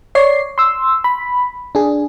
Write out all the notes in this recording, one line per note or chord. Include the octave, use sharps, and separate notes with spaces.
C#5 D5 C7
C6 E6
B5
D4 G#4